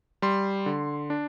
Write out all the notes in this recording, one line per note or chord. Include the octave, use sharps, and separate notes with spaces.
G3 C6
D3
D4